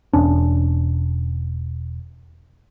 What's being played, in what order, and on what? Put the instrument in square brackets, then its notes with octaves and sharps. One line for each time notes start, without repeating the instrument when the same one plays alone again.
[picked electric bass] E1 C#4 D4